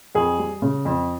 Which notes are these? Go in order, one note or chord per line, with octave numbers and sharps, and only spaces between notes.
F2 G#4
G3
C#3
F2